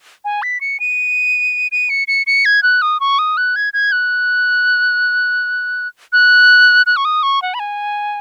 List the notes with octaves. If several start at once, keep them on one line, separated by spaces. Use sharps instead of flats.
G#5
B6
C#7
D#7
D#7
C#7
C#7
C#7
G#6
F#6
D#6
C#6
D#6
F#6
G#6
G#6
F#6
F#6
F#6
C#6
D#6
C#6
F#5
B5
G#5